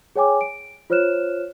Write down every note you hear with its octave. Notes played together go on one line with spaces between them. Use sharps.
G#4 C#5 G5 G#5 D6
D7
F4 C5 C#5 F6 F#6 E7